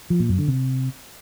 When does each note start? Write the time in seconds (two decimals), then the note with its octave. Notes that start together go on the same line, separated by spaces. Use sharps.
0.10 F3
0.20 A#2
0.29 F#2
0.38 D3
0.48 C3